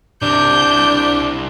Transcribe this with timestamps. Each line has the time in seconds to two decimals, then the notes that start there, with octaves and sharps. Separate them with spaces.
0.22 C2 C3 D4 G6